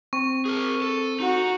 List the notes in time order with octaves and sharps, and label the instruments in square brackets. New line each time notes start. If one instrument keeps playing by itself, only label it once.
[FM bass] C4 [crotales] C#6
[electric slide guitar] G#4 A#4
A4
[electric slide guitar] D#4 [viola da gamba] F#4